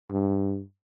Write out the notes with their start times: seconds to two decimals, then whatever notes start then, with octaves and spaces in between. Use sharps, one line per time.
0.11 G2